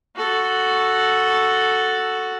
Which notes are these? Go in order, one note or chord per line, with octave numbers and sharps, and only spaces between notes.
F#4 A4